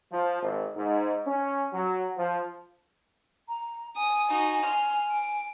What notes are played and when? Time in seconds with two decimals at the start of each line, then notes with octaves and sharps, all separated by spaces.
0.12 F3
0.43 G#1
0.76 G#2
1.27 C#4
1.73 F#3
2.18 F3
3.49 A#5
3.96 G#5 D#6
4.30 D#4 F#4
4.65 C6 F6
5.11 D7